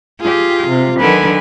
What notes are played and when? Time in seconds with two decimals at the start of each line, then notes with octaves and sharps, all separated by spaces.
0.21 F4 G4 G#4
0.68 C3
1.00 D3 D#3 F#3 B4 G#5